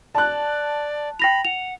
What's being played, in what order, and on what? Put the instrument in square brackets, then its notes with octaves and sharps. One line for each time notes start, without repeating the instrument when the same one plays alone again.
[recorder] D5 [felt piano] A5 F#6
[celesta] G5 A#6 F7 [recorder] B5
[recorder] F#5 [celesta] F7